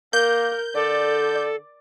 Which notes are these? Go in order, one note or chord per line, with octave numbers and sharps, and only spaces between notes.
A#3 A#4 G6
D3 A4 D5